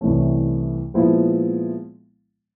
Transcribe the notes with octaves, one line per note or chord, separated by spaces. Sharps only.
C2 C3 E3 A3 C#4
A#2 F3 G#3 B3 E4